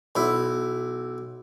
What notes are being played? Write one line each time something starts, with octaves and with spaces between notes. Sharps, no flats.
B1 E4